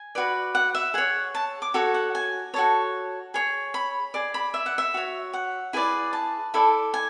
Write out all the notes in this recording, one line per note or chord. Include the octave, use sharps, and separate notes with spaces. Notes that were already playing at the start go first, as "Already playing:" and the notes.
Already playing: G#5
F#4 B4 D5
F#5
E5
G#4 C#5 F#5
A5
D6
F#4 A4 C#5
F#5
G#5
F#4 A4 C#5 A5
G#4 C#5
B5
G#4 D5
B5
E5
F#5
E5
F#4 C#5
F#5
E4 G#4 B4 D5
A5
E4 A4 D5
G#5